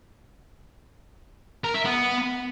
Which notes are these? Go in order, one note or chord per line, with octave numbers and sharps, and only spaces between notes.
A#4
E5
B3